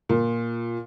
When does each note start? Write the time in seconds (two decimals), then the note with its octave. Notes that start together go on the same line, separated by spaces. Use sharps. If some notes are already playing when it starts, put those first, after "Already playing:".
0.09 A#2